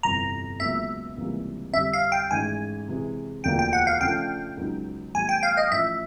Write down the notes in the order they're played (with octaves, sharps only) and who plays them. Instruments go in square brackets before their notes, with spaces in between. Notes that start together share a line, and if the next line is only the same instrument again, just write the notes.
[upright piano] G1 F2 C3 E3 [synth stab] A#5
[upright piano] C#2 B2 F#3 A#3 [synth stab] E5
[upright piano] C#2 C3 E3 G3 A#3
[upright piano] F2 D3 G3 [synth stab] E5
[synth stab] F5
G5
[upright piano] A1 G#2 D#3 G#3 [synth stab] G#5
[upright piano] C3 E3 G#3
[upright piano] E1 D2 D3 F3 A#3 [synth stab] G5
[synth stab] G5
F#5
F5
[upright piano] C#3 F3 A3 D4 [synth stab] G5
[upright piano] C#2 C#3 F#3 B3 D#4
[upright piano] A2 E3 G3 B3 [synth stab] G#5
[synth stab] G5
F5
D#5
[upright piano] A1 A2 F3 [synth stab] E5